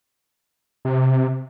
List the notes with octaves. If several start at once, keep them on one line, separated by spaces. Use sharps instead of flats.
C3